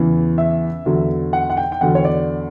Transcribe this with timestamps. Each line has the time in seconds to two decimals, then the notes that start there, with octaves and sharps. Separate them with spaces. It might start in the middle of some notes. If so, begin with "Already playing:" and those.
Already playing: E2 C#3 E3
0.38 E5
0.86 E2 D3 F#3
1.33 F#5
1.50 F#5
1.57 G5
1.72 G5
1.81 E2 D3 F#3 F#5
1.95 C#5
2.05 D5